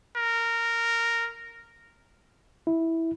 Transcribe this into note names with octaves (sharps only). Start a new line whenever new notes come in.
A#4
E4